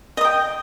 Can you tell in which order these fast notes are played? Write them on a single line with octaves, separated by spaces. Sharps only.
D#5 D#6 G5